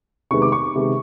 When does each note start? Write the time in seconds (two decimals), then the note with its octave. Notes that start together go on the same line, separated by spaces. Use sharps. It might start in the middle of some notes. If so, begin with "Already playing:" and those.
0.31 C3 D#3 G#3 B3 C#6
0.42 D6
0.52 C#6
0.75 C3 D#3 G#3 B3